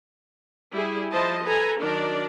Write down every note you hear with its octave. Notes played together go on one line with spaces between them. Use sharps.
G3 E4 G#4
F3 E4 C5 D#5 A5
A4 B4 G#5 A#5
D#3 F#3 D4 A#4 D5